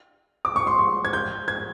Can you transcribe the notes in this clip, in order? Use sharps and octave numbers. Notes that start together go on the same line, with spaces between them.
D6
C#6
C6
C#6
G#6
G6
G#6